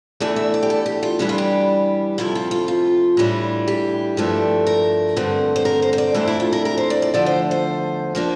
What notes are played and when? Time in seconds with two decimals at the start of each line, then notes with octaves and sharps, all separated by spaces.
0.20 E2 E3 A3 D4 D5
0.36 E5
0.54 D5
0.63 G4
0.70 A4
0.86 G4
1.03 F4
1.19 G2 E3 G3 D4 G4
1.29 F4
1.38 G4
2.18 F2 C3 F3 A3 E4
2.35 F4
2.51 F4
2.68 F4
3.17 A2 E3 G3 D4
3.68 G4
4.17 G2 F3 A3 D4
4.67 A#4
5.16 G2 D3 A3 C4
5.56 C5
5.65 A#4
5.82 C5
5.93 C5
5.98 D5
6.15 F2 C3 E3 A3 D4 C5
6.28 E4
6.40 F4
6.52 A#4
6.65 A#4
6.78 C5
6.90 D5
7.02 D5
7.14 E2 D3 F3 A3 D5
7.26 C5
7.51 C5
8.15 F3 A#3 D4